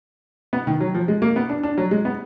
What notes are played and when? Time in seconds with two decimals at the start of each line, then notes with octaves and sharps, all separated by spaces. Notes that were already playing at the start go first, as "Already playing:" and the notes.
0.53 B3
0.67 D#3
0.80 F#3
0.95 F3
1.08 G#3
1.22 A#3
1.36 B3
1.49 D4
1.63 D4
1.78 F#3
1.91 G#3
2.05 B3